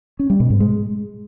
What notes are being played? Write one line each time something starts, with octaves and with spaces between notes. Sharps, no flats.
C#4
G3
B2
G#2
G#3